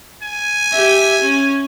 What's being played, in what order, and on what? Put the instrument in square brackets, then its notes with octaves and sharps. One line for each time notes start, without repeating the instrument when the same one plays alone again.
[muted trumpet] G#5
[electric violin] G4 E5
C#4